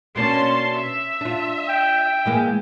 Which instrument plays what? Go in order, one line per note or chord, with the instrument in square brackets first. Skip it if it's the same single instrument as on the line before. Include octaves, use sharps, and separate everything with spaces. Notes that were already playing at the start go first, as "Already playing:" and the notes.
[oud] B2 A#3 D4 [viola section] C#4 A5 C6
[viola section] E5
[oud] D4 F4
[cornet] G5
[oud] E3 G#3 A#3